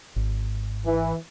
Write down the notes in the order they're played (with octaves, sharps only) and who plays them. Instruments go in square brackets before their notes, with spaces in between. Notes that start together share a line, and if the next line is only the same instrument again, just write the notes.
[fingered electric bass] G#1
[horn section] E3